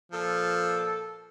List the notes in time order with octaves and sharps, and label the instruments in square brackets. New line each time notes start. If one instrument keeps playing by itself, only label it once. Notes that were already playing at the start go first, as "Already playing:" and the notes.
[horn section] A#2 A4 [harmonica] F3